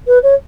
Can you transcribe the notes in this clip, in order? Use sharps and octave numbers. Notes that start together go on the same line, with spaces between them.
B4
C#5